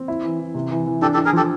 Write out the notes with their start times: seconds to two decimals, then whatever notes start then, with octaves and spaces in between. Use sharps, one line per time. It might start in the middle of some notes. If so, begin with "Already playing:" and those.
Already playing: C4
0.08 E4
0.24 E3
0.39 E3
0.55 C3
0.71 E3
0.87 E3
1.02 D4 G4 A4
1.14 G4 A4
1.18 D4
1.25 G#4 A#4
1.33 F3 G4 A4